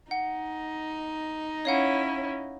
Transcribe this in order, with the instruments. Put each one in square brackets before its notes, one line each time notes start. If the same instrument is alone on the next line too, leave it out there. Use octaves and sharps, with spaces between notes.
[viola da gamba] D#4 [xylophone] F#5
[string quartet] C#4 E4 [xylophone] C#5 F5 F#5